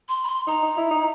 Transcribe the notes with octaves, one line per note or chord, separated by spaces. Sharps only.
C6
B5
C6
D#4 A#5
D#4
E4
D#4